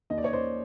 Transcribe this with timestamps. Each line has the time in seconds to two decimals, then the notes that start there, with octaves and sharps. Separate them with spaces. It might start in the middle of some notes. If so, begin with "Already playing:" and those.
0.10 D#2 D#3 D#5
0.18 D5
0.24 C#5 D#5
0.33 C5 D5